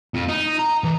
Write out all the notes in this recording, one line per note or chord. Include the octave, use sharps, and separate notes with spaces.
F2
D#4
A#5
E3